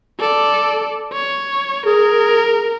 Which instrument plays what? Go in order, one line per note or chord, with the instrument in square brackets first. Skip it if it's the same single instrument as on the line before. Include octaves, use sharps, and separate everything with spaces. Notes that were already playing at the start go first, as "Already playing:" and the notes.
[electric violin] A4 D5
C#5
[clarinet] G#4 [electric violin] A#4